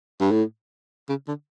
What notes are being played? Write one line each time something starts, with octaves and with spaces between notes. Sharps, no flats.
G2
A2
C#3
D3